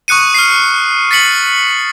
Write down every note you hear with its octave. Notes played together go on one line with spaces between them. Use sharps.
C#6 D#6 F#6 C#7 D#7
F6 C7
A6 B6 C#7 F#7